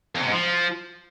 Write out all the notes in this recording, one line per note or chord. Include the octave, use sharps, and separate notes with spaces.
F2
C3
G#2
F3